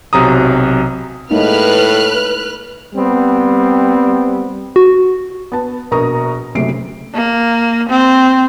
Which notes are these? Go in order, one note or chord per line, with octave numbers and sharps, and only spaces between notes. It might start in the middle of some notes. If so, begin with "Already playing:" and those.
B1 C3 F#3 A#5 D#6
A2 G#3 A#3 D#4 B4 F6 F#6
G3 B3 C4
F#4
B3 A5
A#1 B2 A#4 A#5 C#6 D#6
F#1 F#2 C3 A3 C7 D7
A#3
C4